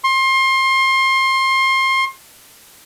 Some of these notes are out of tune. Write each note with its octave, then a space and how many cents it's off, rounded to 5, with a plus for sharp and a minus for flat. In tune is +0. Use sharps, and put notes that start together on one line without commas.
C6 +30